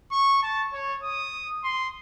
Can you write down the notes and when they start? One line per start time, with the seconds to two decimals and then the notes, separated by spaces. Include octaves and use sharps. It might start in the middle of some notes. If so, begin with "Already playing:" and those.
0.12 C#6
0.43 A5
0.73 C#5
1.03 D#6
1.64 C6